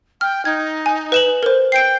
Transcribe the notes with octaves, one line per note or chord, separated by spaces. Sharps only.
G5 F6
D#4 G#6
G#5
B4 E7 F#7
A#4 C5
G5 C7 D7